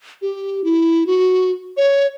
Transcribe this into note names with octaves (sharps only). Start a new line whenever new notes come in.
G4
E4
F#4
C#5